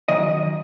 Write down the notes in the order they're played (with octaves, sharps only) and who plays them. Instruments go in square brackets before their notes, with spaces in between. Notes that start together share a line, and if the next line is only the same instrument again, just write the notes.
[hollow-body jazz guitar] F#2 D#3 D#5